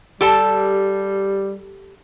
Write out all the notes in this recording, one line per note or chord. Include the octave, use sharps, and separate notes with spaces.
G3 G4 A4 A5